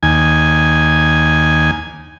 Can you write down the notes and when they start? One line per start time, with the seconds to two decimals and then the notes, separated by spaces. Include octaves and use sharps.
0.03 D#2 G#5